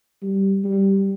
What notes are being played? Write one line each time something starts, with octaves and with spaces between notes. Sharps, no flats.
G3
G3